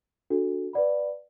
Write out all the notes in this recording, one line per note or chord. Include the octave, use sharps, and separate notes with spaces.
D4 F#4 A4
B4 D5 F#5 B5